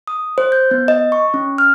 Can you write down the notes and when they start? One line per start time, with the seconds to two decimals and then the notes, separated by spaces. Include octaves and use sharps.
0.07 D#6
0.38 C5
0.52 G6
0.71 B3
0.88 D#5
1.12 C#6
1.34 C#4
1.58 F6